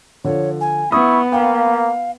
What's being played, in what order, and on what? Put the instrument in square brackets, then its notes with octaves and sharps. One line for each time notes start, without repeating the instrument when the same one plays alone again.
[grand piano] D3 F3 [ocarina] C#5
[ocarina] G#5
[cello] B3 [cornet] E4 [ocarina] C#6 [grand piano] D#6
[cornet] A#3 [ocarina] F5 [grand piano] G5